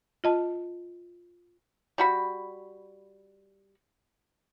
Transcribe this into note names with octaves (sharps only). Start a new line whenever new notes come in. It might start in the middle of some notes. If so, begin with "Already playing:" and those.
F4 D#5 A5
G3 F#4 B5